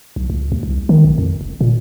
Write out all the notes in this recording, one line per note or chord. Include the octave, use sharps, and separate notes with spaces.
B1
C#2
D#2
C2
D#3
A#1
F2
F1
A#2